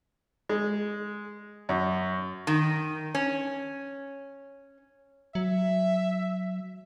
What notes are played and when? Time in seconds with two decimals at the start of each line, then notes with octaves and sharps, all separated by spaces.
0.49 G#3
1.69 F#2
2.47 D#3
3.15 C#4
5.35 F#3 E5